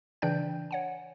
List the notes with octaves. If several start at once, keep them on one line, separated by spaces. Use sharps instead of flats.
C#3 E3 D4 D5 G5 G6
C#5 F#5 G#5